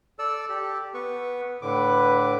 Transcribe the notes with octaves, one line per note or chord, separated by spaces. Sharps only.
A4 D5 E6
G4 A4
B3 B4 C#6
A2 D3 B4 D6